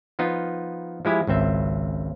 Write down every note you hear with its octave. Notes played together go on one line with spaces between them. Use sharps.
F3 B3 D#4 F4
F3 G#3 E4 G4
G#1 C#2 C4 E5